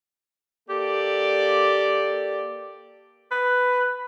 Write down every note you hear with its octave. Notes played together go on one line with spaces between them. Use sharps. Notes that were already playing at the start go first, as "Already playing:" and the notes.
A#3 G4 A4 D5
B4